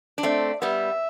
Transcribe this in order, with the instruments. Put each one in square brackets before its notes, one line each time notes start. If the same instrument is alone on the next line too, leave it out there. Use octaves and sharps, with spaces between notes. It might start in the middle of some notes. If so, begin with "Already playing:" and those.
[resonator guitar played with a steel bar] D4
[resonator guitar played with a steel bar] A3 C4 [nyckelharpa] D5
[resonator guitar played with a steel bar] G3 B3 [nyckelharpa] E5